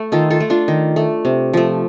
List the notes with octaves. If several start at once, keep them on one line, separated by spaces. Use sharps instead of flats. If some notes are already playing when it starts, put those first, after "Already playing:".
Already playing: A3
D#3 F4 A4
F4 A4
A3
D4 F4
D#3
A3
C3
F3 A3